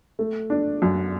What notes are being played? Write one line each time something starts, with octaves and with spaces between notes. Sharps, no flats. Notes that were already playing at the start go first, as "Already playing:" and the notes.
A3
D4
F#2